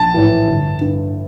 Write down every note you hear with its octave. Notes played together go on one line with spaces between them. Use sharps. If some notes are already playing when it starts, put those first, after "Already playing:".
Already playing: A#1 A5
A2 E3
G1
G2 D3